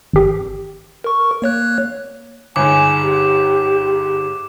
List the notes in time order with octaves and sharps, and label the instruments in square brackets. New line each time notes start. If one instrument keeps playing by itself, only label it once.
[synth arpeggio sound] G#1 G4
[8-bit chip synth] A#4 C#6
A#3 C#5 F#6
[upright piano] G1 G#2 [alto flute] G#5 [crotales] D6
[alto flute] G4